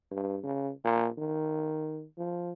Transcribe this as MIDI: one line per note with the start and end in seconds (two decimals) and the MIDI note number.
0.11 0.38 43
0.43 0.71 49
0.84 1.08 46
1.18 2.05 51
2.17 2.53 53